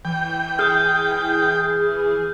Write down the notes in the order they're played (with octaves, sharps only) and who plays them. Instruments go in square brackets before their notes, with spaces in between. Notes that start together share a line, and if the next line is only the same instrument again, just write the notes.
[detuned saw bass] E3 [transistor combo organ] G5
[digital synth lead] G#4 [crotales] F6 G6